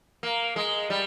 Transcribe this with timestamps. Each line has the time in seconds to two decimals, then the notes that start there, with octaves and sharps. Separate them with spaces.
0.23 A#3
0.56 G#3
0.90 G3